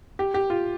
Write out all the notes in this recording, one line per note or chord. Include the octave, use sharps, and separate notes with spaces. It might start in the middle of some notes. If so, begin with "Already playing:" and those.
G4
G4
F4